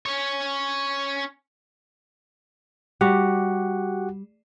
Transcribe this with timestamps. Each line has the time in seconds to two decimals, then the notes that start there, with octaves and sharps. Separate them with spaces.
0.06 C#4 C#5
3.01 G3 F#4 G4 F#5